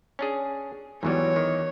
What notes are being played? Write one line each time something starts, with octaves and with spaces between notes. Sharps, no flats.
C#4 D4 G#4
E2 G#2 E3 F#3 G3 B3 C#5
D#3